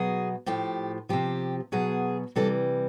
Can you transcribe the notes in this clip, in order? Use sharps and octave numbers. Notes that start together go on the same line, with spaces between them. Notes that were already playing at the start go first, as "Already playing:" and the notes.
Already playing: B2 F#3 G#4
A2 F3 G4
C3 F3 G4
B2 F#3 G#4
C3 E3 G3 A4